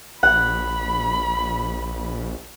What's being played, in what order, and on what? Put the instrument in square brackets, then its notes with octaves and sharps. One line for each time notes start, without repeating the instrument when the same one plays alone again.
[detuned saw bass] A#1 [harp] F#5 [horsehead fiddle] B5